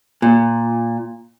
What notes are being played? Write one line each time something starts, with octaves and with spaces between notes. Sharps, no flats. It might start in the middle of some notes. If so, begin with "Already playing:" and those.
A#2